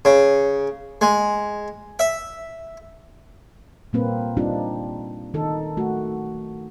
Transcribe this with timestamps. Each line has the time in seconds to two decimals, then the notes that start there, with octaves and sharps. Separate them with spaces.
0.05 C#3
1.01 G#3
1.99 E5
3.93 A#2 G3 A#3 C4 B4
4.37 G3 C4 D4 D#4 F4 G4
5.34 D#3 D#4 A4
5.77 A3 F#4